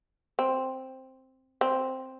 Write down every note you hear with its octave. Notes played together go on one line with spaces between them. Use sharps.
C4
C4